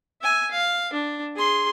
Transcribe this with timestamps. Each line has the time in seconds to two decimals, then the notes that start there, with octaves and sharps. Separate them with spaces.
0.22 E5 G#5
0.51 F5
0.93 D4
1.36 G#4 C6